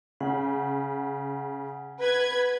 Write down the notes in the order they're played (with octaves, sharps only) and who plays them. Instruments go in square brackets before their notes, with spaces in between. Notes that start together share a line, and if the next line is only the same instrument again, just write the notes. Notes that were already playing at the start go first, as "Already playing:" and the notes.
[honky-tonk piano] C#3 [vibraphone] F#5
[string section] B4 G#6